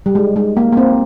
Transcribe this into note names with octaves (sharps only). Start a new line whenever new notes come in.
G3
G#3
G#3
A#3
A#3
C4